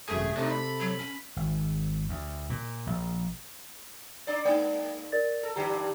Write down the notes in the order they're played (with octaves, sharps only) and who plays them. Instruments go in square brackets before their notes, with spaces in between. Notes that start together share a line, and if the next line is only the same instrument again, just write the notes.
[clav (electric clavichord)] G#1 F#2 A4 [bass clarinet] C3 [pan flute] A3 [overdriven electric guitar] G#4
[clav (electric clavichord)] C3 [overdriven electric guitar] D4 D#4 [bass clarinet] A4
[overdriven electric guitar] B5
[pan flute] F#3
C#4
[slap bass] G#1
D2
A#2
A#1
[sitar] D4 D5
[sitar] G#3 A#3 [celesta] D#4 D5
[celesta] A#4 D5 A6
[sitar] A4
[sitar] G2 D3 G4 [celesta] A#5